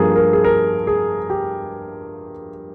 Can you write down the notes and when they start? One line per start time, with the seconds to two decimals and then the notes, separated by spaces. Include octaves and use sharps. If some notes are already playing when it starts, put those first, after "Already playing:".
Already playing: G2 F3 A#3 G#4
0.16 A#4
0.33 G#4
0.44 A#4
0.87 G#4
1.30 G4